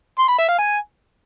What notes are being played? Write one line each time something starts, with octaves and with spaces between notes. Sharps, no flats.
C6
B5
E5
F5
G#5